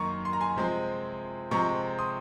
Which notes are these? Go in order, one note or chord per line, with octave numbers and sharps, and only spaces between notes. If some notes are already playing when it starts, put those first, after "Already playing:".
Already playing: F#2 D#3 A#3 D#4 A#5 C6 C#6
C6
A#5
G#5 C6
C3 F3 G#3 C4
C3 F3 G#3 C4 A#5 C#6
C6 D#6